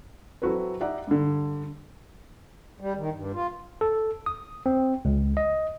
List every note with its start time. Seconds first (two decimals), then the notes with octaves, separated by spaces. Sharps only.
0.42 F#3 C4 E4 F#4 A4 B4
0.80 D#4 G4 D5 E5 F#5 A#5
1.07 G2 D3
2.80 G3
2.97 D#3
3.13 G2
3.34 F4
3.81 A4
4.26 D#6
4.66 C4
5.05 C#2
5.37 D#5